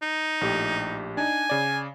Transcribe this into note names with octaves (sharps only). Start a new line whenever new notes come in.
D#4
A#1 A2 G4
D4 D#4 G#5
C#3 D5